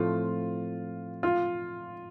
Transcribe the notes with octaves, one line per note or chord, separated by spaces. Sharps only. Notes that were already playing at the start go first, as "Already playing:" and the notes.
Already playing: A2 F3 A3 C4 F4
F4